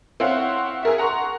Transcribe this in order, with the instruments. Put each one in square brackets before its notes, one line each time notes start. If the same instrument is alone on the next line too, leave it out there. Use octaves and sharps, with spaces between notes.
[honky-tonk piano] C4 E4 C#5 F5 F#5
G#4 A#4 E5
F#5 A#5 C6 C#6